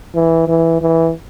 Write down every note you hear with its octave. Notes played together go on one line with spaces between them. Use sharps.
E3
E3
E3